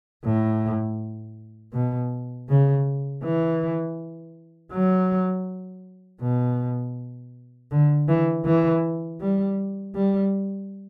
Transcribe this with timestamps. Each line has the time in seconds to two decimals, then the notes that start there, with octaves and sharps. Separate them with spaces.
0.25 A2
1.73 B2
2.49 C#3
3.23 E3
4.72 F#3
6.21 B2
7.71 D3
8.08 E3
8.45 E3
9.21 G3
9.95 G3